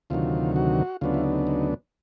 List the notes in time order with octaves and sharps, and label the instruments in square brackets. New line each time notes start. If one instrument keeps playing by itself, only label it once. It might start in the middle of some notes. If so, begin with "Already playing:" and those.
[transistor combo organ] D2 C3 D#3 F#3 F4
F#4
D2 C#3 F#3 B3 D4 F4
E4
D#4
D#4